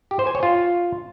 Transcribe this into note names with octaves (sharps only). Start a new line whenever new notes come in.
G4
C5
G#5
C#5
F4